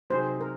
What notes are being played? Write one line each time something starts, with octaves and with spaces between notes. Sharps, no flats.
C3 F#3 C4 D#4 G#4 C5
A#4